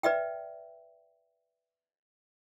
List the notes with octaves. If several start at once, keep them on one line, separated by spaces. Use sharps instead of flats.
B4 D5 E5 G5